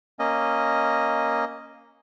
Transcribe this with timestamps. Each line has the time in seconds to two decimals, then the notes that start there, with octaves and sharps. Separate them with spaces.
0.19 A#3 C#4 D#5